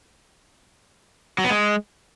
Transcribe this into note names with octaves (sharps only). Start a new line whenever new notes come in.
F#3
B3
G#3